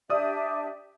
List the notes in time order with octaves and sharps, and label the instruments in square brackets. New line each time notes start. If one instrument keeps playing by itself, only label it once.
[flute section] D4 G4 E5 [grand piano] D5 D#6